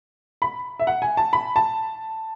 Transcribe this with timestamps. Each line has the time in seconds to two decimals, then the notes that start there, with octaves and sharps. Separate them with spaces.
0.42 B5
0.80 E5
0.87 F#5
1.02 G#5
1.17 A5
1.33 B5
1.56 A5